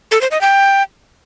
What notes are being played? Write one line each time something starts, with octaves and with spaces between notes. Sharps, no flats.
A4
C5
D#5
G5